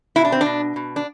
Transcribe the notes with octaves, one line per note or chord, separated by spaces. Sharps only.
B2 E4
D4
C4
D4
B2
B2
D4